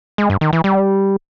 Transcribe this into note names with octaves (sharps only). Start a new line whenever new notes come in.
G#3
G2
D#3
E3
G3